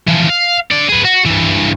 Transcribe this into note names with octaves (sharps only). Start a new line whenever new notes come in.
E3 F3
F5
D3 D5
G#4 B4
F#4
G2 E3